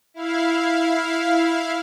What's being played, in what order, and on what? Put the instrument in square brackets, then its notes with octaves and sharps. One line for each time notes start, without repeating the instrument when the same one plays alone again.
[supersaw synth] E4 F5